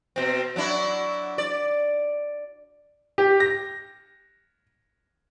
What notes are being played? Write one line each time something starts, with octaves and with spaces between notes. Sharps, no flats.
B2 C4
F#3 D4 E4
D5
G4
A#6